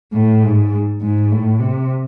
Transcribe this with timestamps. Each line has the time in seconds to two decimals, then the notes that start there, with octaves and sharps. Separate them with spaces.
0.13 A2
0.43 G#2
1.01 G#2
1.31 A2
1.60 C3